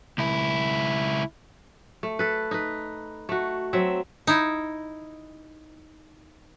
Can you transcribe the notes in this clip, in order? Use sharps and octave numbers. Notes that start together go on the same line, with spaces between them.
C#2 E4
A3
A4 B4
D#4 B4
A3 F#4
F#3 C4 E5
D#4 E4